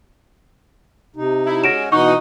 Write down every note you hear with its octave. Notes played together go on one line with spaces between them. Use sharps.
C3 D#4
E4
G#3 C#4 F#4 A#6 D7 E7
B2 E3 D#4 F#5 C#6